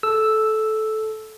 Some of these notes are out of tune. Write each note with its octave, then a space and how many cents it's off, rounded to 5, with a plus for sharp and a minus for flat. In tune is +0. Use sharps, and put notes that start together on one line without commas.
A4 -15 E6 +0